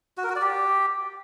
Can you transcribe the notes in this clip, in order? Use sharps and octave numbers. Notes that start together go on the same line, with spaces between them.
F#4
A#4
F#4
D5
G4